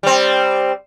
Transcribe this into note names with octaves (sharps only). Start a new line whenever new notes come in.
G3 C4